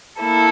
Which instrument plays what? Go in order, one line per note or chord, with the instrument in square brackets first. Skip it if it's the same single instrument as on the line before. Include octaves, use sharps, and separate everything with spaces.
[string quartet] A#3 E4 A4